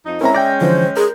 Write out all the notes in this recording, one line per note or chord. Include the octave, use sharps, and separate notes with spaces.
F2 F3 D#4
G#3 C4 C#4 E4 A#4 E5 A#5
D5 G5 G6 A#6
D3 E3 F3 C5
G#4 A#4